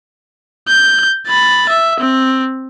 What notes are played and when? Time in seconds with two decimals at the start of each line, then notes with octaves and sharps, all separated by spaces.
0.68 G6
1.28 B5 A6
1.69 E5
2.00 C4